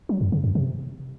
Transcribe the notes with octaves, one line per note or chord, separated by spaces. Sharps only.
F#3
F#2
C#3
F#2
C3